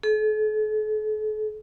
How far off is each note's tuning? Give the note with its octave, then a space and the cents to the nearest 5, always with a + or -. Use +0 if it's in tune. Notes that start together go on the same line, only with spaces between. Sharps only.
A4 -45